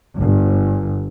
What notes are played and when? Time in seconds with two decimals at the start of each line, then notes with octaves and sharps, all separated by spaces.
0.16 G1